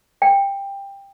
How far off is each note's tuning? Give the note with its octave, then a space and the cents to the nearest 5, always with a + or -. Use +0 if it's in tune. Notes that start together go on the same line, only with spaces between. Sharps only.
G5 +15